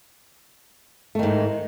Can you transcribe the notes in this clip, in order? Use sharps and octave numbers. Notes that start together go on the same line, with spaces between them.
G#2 D#3 A3